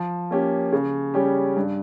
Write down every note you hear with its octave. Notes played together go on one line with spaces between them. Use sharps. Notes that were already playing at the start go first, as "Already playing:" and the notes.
Already playing: F3
A#3 C#4 G4
C#3
G3 C#4 G4
G2